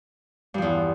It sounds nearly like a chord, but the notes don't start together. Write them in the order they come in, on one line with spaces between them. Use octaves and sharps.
G2 F3 E2